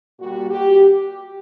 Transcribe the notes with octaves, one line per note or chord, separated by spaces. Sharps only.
A#2 G3 F#4
G4